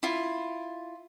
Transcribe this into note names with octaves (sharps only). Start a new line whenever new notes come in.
E4 F4